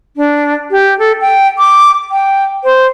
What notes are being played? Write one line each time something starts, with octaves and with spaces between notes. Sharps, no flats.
D4
G4
A4
G5
D6
G5
C5